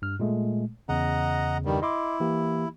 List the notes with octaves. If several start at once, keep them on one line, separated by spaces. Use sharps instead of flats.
G2 F6
A#2 G#3 A3
E2 C#3 D#5 F#5 A#5
G2 D#3 G3
E4 D#5 C6 D6
E3 A#3 G4